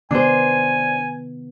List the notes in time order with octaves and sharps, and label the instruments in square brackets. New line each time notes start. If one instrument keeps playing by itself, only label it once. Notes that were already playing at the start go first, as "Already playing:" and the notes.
[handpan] C3 D#3 B3 [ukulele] D4 C5 [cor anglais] G#5